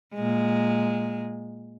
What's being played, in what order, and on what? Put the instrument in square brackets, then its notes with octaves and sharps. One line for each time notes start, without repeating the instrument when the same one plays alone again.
[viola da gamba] A#2 G#3